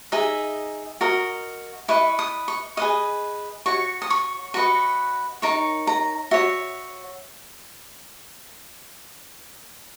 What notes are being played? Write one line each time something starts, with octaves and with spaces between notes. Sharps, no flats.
D#4 G#4 D#5 E5
F#4 A#4 D#5
E4 B4 D#5 C#6
D#6
C#6
G#4 B4 D#5 D#6
F#4 C#5 C#6
D#6
C#6
F#4 B4 D#5 C#6
D#4 A#4 C#5 C#6
A#5
F#4 C#5 E5